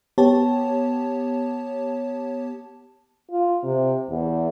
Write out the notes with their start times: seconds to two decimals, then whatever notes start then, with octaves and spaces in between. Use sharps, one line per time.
0.18 B3 G4 C#5 A5
3.31 F4
3.64 C3
4.09 E2